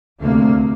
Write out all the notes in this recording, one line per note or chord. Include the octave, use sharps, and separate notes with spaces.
D2 C3 A#3